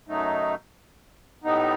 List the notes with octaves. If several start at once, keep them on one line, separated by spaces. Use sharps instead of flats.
F#2 F#3 A3 D#4
A2 G3 B3 D#4